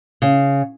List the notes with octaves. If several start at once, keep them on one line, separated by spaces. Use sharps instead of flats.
C#3